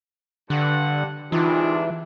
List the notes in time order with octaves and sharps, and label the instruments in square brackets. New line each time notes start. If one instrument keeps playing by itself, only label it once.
[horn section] G2 F#5 [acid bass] D3
[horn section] G#2 C3 D4 [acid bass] E3 [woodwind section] D#4 F4